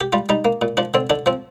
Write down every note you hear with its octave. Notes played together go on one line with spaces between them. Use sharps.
G4
G3 F4
G3 D#4
A#3
A#2
F3 D4
D3 C4
D3 D4
F3 C4